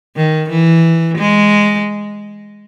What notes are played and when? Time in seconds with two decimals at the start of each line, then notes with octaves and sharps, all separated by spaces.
0.16 D#3
0.50 E3
1.18 G#3